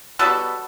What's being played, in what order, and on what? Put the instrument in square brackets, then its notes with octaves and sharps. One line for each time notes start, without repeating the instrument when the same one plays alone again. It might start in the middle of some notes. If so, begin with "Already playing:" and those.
[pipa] B2 G3 B3 F#4 A4